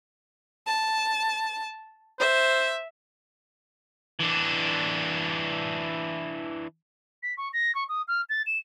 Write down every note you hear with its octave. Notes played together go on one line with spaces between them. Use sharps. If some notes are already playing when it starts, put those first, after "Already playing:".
A5
C5 E5
E3 D4
B6
C#6
A#6
C#6
D#6
F6
A6
E7